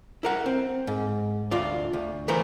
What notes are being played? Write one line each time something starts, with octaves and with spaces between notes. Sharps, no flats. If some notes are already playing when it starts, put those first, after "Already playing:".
E4 A#4 F#5
C4
G#2
D2 F4 D5
D2
E3 A3 B3 E4 A#4 C5